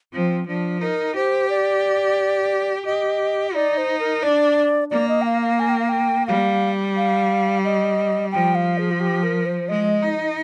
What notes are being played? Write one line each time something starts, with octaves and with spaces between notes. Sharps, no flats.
F3 C4
F3 D4
D#4 A#4
G4 C5
D5
G4 D#5
D#4 D5
C5
A#4
D4 D5
A#3 D5
D#5
G5
F5
F5
G#5
G5
F5
G5
G3 F5
F5
D#5
F3 G5
F5
G#4
F4
G4
A#4
C5
G#3 D#5
D#4